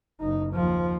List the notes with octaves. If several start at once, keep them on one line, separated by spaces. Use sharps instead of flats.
F#1 D#4
D#2 F3